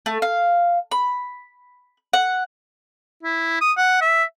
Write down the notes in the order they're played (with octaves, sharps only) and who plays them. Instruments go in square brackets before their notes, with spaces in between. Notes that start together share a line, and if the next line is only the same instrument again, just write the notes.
[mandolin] A3
F5
B5
F#5
[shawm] E4
D#6
F#5
E5